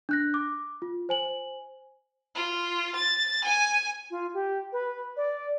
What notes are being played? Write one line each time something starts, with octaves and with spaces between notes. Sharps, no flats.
D4 F#6 A#6
D6
F4
C5 G#5 F#7
F4
A6
G#5
F4
G4
B4
D5